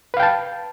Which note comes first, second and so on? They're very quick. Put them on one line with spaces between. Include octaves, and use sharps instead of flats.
B4 F5 G5 A5